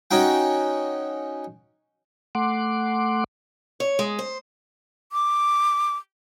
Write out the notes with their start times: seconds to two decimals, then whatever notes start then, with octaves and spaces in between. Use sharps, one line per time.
0.11 C#4 D#4 F#4 G5
2.35 A3 F#5 C6 D6
3.80 C#5
3.99 G#3
4.19 C5
5.12 D6